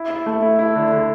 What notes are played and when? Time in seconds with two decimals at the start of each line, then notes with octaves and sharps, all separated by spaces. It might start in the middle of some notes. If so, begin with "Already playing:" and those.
Already playing: E4
0.10 E4
0.26 A3
0.42 E4
0.59 E4
0.76 D3
0.92 D3